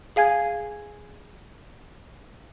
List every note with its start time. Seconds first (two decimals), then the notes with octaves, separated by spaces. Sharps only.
0.16 G#4 F5 G#5 G#6